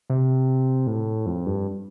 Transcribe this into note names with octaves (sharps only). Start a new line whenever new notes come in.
C3
A2
F2
G2